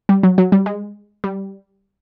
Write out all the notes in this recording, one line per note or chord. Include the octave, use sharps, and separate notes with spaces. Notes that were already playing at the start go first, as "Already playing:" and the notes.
G3
F#3
F#3
G3
G#3
G3